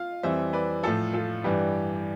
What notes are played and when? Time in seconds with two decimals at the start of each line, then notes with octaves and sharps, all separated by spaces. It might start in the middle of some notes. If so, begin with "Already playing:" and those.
Already playing: F4 F5
0.23 F2 E3 G3 C5 E5
0.53 B4 D5
0.83 A2 F3 F4 A4
1.13 F4 A4
1.44 G2 E3 G3 G4 B4